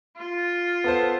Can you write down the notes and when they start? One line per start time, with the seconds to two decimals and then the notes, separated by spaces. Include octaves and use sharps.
0.17 F4
0.84 B3 A4 C5